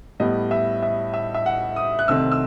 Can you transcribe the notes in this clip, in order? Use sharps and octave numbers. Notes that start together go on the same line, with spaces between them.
A2 G3 B3 D#5
E5
E5
E5
E5
F#5
D#6
F#6
C2 C3 D#3 A3 C4 E6
E6